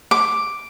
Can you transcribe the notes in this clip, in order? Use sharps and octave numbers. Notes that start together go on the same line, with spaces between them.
D6